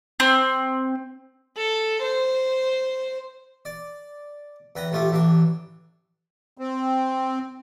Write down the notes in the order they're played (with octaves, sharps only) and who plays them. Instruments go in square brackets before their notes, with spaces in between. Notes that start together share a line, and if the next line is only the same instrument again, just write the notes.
[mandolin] C4
[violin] A4
C5
[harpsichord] D5
E2 B4 G5 A#5
A1 A3 F4 G4 D6
A1 E3 D4 G5
[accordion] C4